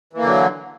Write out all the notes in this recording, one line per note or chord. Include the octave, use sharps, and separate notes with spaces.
D3 E3 F#3 A#3